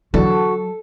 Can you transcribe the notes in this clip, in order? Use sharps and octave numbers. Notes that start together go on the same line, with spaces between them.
F2 D3 E3 F#3 F#4 A4